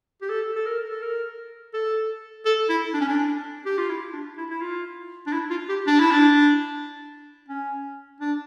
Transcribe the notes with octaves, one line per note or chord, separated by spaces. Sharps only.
G4
A4
A4
A#4
A4
A#4
A4
A4
E4
D4
C#4
D4
G4
F4
E4
D4
E4
E4
F4
D4
E4
F4
G4
D4
E4
D4
C#4
D4